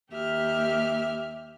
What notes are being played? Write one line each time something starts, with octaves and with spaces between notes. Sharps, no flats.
D#2 G4 E5 F6